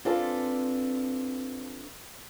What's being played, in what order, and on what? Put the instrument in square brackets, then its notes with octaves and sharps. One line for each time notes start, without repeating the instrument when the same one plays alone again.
[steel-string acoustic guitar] C4 D4 F4 A4 B4 G#5